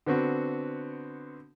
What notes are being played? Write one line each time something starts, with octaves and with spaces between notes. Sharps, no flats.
D3 B3 C4 F#4